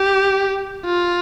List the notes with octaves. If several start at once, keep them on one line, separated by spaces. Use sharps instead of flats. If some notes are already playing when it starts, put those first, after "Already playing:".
Already playing: G4
F4